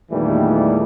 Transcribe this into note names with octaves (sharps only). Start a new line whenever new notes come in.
E2 A#2 D#3 E3 G3 A3